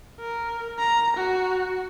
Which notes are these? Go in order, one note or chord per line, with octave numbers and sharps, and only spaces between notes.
A#4
A#5
F#4